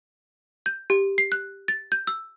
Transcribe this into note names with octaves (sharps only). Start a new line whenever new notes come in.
G6
G4
C7
F#6
A6
G6
E6